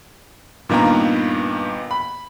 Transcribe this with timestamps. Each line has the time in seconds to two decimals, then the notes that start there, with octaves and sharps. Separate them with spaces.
0.69 G2 A#2 D#3 A#3 B3 A#5
1.91 B5